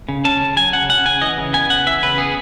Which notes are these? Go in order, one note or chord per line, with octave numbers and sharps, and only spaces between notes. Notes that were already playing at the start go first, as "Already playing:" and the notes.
C#3
C#4 A5
C#3
F#3 G#5
C#3 F#5
C#4 F#5
C#3 G#5
E3 D#5
C#3
B3 G#5
C#3 F#5
E3 E5
C#3 B4
B3 G#4